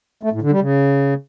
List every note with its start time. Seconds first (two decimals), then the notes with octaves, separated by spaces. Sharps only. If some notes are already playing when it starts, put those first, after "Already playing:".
0.23 A3
0.33 A2
0.42 D3
0.51 G3
0.61 C#3